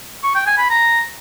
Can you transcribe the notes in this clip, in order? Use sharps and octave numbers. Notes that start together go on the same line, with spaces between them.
C#6
G5
G#5
B5
A#5